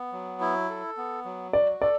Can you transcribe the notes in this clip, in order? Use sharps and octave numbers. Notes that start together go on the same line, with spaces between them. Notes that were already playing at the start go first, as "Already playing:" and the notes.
Already playing: B3
F#3
E4
A4
B3
F#3
F#4 D5
A4 D5